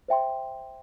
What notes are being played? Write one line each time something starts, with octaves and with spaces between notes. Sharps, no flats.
C5 E5 G5 C6